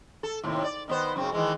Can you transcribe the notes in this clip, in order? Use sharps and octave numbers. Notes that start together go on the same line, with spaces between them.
A4
D#2 A2 C3
D5
D#3 B3 C5
F#2 C#3 C4
D#3 E3 G#3